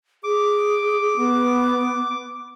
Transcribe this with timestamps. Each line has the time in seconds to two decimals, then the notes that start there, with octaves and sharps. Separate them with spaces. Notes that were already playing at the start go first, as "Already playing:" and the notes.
0.24 G#4 D6
1.16 B3